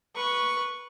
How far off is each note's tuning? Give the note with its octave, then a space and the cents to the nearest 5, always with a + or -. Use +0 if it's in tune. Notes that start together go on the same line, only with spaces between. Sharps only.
B4 -15 C#6 +0